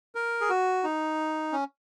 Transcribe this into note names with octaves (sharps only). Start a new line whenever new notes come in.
A#4
G#4
F#4
D#4
C#4